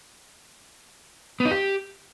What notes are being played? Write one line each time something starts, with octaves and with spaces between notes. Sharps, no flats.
B3
D#4
G4